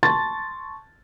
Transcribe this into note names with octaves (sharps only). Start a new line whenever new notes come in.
A5 C6 C#6 A6